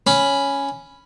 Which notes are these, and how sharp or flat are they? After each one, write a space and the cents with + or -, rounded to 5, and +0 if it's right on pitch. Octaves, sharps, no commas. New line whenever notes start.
C#4 +0 B5 +0